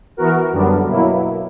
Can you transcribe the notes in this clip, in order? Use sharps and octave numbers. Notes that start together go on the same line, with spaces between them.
E3 B3 F#4 A#4
F#2 D3 G3 B3 D4
B2 F#3 A#3 E4